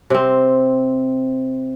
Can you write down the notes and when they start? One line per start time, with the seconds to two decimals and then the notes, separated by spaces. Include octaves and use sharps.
0.10 C3 C4